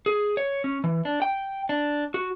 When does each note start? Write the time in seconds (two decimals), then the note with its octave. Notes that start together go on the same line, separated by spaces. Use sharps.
0.06 G#4
0.37 C#5
0.64 C#4
0.84 E3
1.05 D4
1.22 G5
1.69 D4
2.14 F#4